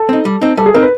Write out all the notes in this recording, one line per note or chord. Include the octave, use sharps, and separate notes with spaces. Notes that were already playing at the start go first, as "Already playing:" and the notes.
Already playing: A4
C4 D#4
G3
C4 D#4
G3 A4
G#4
C4 D#4 A#4
B4